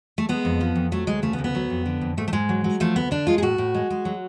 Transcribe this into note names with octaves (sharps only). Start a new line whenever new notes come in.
A3
G#3 B3
F2
F3
F2
F#3 A3
D2 G#3
C#3 A3
B3
D2
B3
F#3
F2
D3
F2
G#2 A3
A3
G#2 G#3
F#3
F#3
F3 A3
D2 B3
D3 D4
G#3 F4
G#4
A2 F#4
A2
G#3
G#3
F#3